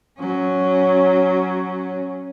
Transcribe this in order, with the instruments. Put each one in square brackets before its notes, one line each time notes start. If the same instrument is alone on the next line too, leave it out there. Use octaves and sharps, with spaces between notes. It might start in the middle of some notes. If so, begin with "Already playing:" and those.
[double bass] F#3 C#4